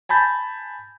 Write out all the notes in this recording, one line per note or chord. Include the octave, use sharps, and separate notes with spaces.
G#5 A5 B5 G6 A6